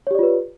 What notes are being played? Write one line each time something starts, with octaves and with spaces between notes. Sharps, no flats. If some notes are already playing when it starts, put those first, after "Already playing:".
F4 G4 B4 C#5 D5